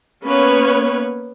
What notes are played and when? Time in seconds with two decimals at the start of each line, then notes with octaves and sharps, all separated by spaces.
0.24 A#3 B3 C#4 B4 C#5